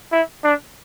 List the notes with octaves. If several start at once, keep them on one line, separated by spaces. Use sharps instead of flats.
E4
D4